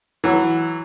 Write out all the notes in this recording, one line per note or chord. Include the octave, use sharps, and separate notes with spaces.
E3 F#3